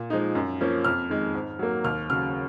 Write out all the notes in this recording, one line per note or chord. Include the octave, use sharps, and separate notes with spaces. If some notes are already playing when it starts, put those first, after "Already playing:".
Already playing: A#2
F3 G#3 D#4
F#2
F3 A#3 C#4
F2 F6
D#3 G#3
G#2
F#3 A#3
D#2 F6
C#3 F#3 F6